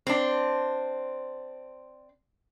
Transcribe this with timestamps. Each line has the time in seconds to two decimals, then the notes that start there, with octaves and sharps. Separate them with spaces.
0.07 C4 D4